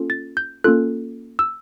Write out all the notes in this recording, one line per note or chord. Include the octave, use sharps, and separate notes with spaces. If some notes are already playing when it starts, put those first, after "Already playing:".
Already playing: A#3 C#4 F4 A4
A6
G6
A#3 C#4 F4 A4 F#6
E6